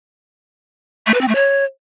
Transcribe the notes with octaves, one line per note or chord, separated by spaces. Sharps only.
A3
B4
C4
A3
C#5